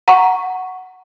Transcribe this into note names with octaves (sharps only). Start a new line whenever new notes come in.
F#5 A#5 C#6